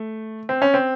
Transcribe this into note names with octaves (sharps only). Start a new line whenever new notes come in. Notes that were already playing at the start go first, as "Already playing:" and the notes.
Already playing: A3
C4
C#4
C4